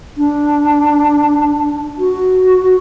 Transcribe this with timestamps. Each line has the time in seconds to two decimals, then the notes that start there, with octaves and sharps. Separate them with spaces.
0.17 D4
1.98 F#4